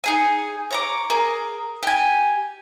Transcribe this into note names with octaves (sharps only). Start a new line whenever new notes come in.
D#4 G#4 G#5
C#5 A#5 D6
G#4 A#4
G4 G#5